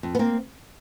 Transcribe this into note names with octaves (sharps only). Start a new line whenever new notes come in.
F2
B3
A#3 C4